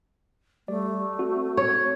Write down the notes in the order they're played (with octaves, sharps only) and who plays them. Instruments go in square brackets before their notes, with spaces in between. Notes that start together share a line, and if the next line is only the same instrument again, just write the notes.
[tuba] G3 [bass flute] A3 [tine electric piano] D5
[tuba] C4 [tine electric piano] F#4
[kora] C#5